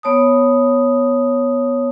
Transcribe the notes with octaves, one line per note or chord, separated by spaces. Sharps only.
B3 C#5 A5 D#6